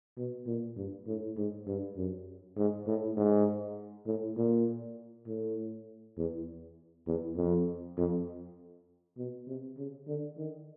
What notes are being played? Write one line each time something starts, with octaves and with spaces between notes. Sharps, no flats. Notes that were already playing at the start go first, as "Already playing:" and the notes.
B2
A#2
G2
A2
G#2
G2
F#2
G#2
A2
G#2
A2
A#2
A2
E2
E2
F2
F2
B2
C3
C#3
D3
D#3